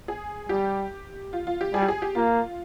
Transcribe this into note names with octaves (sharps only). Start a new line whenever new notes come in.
G#4
G3 G4
F4
F4
G4
G3 G#4
G4
G#4
G4
A#3 F4